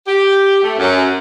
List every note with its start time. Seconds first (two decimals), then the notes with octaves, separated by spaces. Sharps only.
0.06 G4
0.63 A3
0.79 F#2